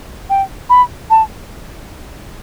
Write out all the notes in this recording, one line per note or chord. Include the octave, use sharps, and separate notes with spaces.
G5
B5
A5